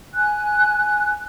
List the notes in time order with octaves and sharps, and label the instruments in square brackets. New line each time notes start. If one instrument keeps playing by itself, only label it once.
[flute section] G#5 F#6